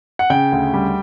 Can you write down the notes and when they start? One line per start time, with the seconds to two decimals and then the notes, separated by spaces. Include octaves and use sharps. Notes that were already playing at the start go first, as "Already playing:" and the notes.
0.19 F#5
0.30 C#3 G5
0.52 D2
0.74 G3